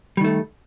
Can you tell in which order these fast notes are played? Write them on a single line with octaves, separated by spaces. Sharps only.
G3 D#3 A3